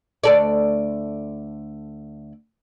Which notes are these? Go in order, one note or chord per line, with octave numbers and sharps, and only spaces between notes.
D2 A4 D5